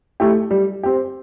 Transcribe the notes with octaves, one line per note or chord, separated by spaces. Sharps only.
A3 E4 G4
G3
C4 G4